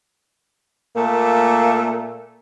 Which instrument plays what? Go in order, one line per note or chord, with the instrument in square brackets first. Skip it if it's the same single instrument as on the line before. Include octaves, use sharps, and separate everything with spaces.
[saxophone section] A#2 A3 A#3 E5